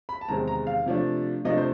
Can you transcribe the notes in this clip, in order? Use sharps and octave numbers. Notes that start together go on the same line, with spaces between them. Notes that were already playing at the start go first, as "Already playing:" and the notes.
B5
A5
E2 C3 D#3 G#3 C4 A#5
A#5
F5
C3 F3 A3 D4
C3 F3 A3 D4 D#5
C5